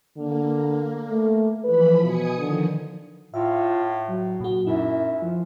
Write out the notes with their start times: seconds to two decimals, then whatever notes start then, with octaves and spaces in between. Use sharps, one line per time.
0.17 D3 A#3
1.10 A3
1.64 E3 F3 B4 B5
2.03 B2 G#5 D#6 C#7
2.38 D3 D#3 F3
3.34 A2 F4 E5
4.08 F#3
4.40 A#2 F#4
4.67 F#2 D#4 E4
5.22 F3